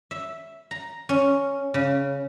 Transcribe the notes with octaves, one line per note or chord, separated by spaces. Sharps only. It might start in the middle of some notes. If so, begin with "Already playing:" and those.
E5
A#5
C#4
C#3